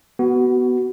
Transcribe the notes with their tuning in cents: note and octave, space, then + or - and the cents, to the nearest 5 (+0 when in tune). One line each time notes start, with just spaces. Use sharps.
B3 +0 F#4 +25